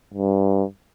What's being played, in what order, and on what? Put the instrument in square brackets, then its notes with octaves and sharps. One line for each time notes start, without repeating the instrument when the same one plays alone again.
[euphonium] G2